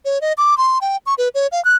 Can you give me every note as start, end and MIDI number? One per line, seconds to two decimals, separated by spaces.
0.05 0.21 73
0.21 0.33 75
0.38 0.57 86
0.58 0.79 84
0.81 0.97 79
1.06 1.14 85
1.18 1.29 71
1.35 1.47 73
1.52 1.63 77
1.65 1.76 90